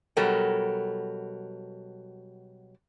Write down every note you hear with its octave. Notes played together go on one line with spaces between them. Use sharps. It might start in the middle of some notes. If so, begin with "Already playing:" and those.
B2 F#3 G3 A4 A#4